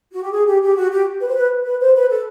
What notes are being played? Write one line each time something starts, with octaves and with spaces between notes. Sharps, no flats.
F#4
G4
G#4
G4
G4
F#4
G4
B4
C5
B4
B4
C5
B4
A4